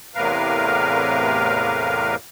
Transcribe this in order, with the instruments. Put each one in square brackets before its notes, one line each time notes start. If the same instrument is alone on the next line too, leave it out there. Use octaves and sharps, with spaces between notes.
[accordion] E2 A2 C3 A#4 B4 F5